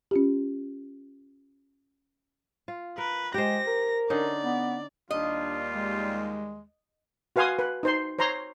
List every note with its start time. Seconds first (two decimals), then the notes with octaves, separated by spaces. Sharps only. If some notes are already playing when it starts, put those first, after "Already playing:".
0.11 C#4 F4 G4
2.68 F4
2.98 A#4 B4
3.34 G#3 G4 C5 A#6
3.67 A#4
4.10 D3 C#4 D#4 D5
4.44 B3
5.11 D#2 G3 D4 F4 D#5
5.71 G#3
7.36 F#4 B4 F5 G#5 C6 D#6
7.59 B4
7.83 D#4 C5 C6
8.19 C5 C#5 A#5 C6